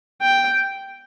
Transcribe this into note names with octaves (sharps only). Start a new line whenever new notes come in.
G5